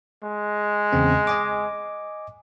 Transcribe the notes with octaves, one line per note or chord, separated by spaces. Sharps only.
G#3
E2 C#3 C4
D#5 G#5 D6